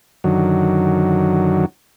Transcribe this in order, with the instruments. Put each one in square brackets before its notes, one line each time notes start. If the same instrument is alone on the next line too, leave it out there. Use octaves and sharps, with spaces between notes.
[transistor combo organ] F#2 D3 D#3 F#3